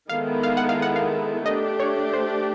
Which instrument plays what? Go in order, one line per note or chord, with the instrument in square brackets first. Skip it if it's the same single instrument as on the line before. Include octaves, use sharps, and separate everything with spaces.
[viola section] D#3 G#3 B3 E4 A4 [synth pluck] F5
[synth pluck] F5
F#5
F5
F#5
F5
[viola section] A3 D4 G4 [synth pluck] D#5
[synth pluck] C#5
C5